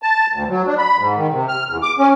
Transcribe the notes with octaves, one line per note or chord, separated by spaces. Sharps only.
A5
D2
F#3
D4
B5
G#2
D#3
C3
F6
E2
D6
C#4